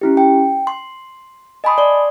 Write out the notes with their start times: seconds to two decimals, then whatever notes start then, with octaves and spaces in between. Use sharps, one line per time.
0.01 C#4 E4 G4
0.17 G5
0.67 C6
1.64 D#5 G#5 A5 B5 C6 D#6
1.78 D5 C6